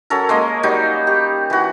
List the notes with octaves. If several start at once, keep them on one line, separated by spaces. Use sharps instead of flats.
F#3 C#4 A4 A#4
G#3 A#3 D#5
F#3 G3 D#4
G4
E3 F#4